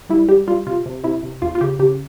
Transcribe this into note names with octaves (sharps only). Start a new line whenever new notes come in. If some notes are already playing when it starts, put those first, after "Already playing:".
G3 E4
G3 G4
G3 F4
C3 F4
C3
C3 E4
C3
E2 F4
F4
C#3 G4
C#3 G4